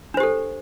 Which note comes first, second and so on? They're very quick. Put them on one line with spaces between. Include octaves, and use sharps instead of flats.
D4 C5 G4 A4